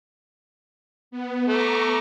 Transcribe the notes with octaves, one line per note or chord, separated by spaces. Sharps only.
B3
A3 A#5 C#6 D6